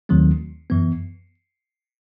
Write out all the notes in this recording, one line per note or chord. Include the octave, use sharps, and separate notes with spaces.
D#2 D#3 F#3 A3 C4
F#2 E3 B3